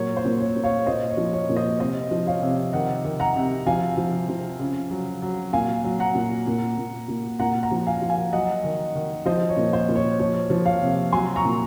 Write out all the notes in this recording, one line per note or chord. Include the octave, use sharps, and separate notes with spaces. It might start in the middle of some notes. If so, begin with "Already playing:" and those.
Already playing: A#2 F#3 C#5
C5
A#2
C#5
A#2
C#5 F5
A#2 C5 D#5
C#5
F3
C#5
A#2
C5 D#5
C3 C5 D#5
F3
C#5 F5
C3
D#3 D#5 F#5
D#3
F#5 A#5
C3
F3 F5 G#5
F3
F3
C#3
F#3
F#3
A#2 F5 G#5
F#3
F#5 A#5
A#2
A#2
A#2
A#2
A#2 F#5 A#5
F#5 A#5
F3
F5 G#5
F3
F5 G#5
F#3 D#5 F#5
D#3
D#3
F3 C5 D#5
C#5
A#2
C5
A#2
C#5
F3 C#5
F3
C#5 F5
C3
F#3 G#5 C6
A#5 C#6
A#2